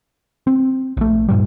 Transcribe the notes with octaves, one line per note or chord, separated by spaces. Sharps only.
C4
A#1 A3
G2 A#2 G3